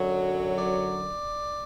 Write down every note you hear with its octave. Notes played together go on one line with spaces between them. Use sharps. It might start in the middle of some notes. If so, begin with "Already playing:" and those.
Already playing: F#2 D3 F#3
D5